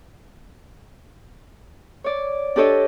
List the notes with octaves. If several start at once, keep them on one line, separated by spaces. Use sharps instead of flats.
C#5 D5
D4 G4 A4 C#5 D#5